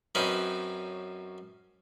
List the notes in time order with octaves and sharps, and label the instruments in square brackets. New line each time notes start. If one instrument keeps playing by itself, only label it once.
[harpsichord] F#2 C4 C#4 D#4 B4